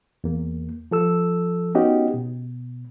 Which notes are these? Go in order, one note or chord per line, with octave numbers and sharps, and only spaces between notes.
E2 A#3
F3 A4 E6
B3 C#4 D#4 F#4 G4 D#5
B2